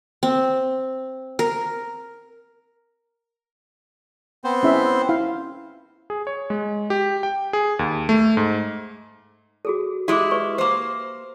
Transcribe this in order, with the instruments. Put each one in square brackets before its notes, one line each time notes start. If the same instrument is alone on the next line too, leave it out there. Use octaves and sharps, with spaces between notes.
[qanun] C4
A#4
[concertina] B3 C4 C5
[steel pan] C#4 E4 E5
E4 F5
[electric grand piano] G#4
C#5
G#3
G4
G5
G#4
D#2
A3
G#2
[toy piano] F#4 G#4 A4
[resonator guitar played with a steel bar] G#3 E4 [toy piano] G4 D6
[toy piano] B4 C#6
[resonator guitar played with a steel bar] A#3 C5